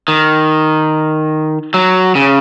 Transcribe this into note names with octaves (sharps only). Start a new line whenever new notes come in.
D#3
F#3
C#3